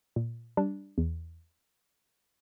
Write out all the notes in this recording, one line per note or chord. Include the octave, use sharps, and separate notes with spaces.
A#2
G3 D4
E2